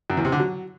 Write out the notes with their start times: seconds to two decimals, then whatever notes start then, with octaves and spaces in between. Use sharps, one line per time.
0.10 F#2
0.17 E2
0.25 C3
0.32 D3
0.40 F#3